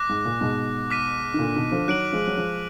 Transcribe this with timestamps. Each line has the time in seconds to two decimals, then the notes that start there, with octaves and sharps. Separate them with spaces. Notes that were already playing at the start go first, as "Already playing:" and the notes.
Already playing: D6 F#6 A#6
0.09 G#2
0.25 A#2
0.41 G#2 B2
0.91 D6 F6 B6 D#7
1.34 D#3
1.39 A#2 D3
1.56 B2 D#3
1.72 D3 F3
1.88 D#3 F#3 F#6 D7 F#7
2.12 F3 G#3
2.27 F#3
2.37 F3 G#3